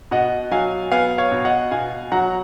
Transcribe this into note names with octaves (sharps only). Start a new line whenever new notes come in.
B2 D#5 F#5
F#3 F5 G#5
B3 F5 G#5
C#5 F5
B2
D#5 F#5
B2 F5 G#5
F#3 F#5 A#5